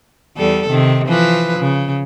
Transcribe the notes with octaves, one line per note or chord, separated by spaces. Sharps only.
E2 G3 A4
C3 D#3
E3 F3 B4
C#3